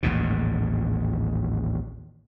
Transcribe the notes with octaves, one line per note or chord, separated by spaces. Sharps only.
A1 D#2 G#2 B2